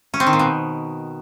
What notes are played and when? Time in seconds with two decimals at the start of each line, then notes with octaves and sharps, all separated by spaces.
0.14 C#4
0.20 C4
0.27 D#3
0.33 A#2
0.39 B2